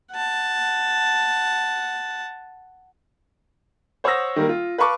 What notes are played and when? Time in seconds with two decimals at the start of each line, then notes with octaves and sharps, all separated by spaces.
0.12 F#5 A5
4.04 C5 C#5 F#5 D#6 E6 A#6
4.36 D#3 G3 A#3
4.49 F4
4.78 B4 F5 A5 C#6 D6